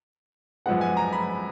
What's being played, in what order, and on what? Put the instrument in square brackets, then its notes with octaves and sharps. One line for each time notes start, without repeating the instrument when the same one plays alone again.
[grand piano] F#2 F3 G#3 B3 F#5
G#5
A#5
B5